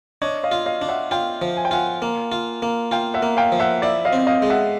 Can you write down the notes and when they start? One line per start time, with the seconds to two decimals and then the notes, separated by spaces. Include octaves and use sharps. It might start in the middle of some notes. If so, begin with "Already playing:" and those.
0.22 D4 C#5 D#5
0.44 D#5 F5
0.51 F4
0.66 D#5 F5
0.82 D4
0.89 E5 F#5
1.11 F4 F5 G5
1.42 F3
1.57 G#5
1.65 G5
1.71 F4 F#5 G#5
2.02 A#3
2.32 F4
2.62 A#3
2.91 F4 F5 G5
3.14 E5 F#5
3.22 A#3
3.37 F5 G5
3.52 F3
3.60 E5 F#5
3.82 E4 D5 E5
4.05 D#5 F5
4.13 C4
4.27 D#5 F5
4.42 G#3
4.50 E5 F#5